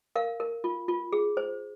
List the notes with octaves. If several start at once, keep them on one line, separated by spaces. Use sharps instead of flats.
A#4 F5
A#4
F4
F4
G#4
C5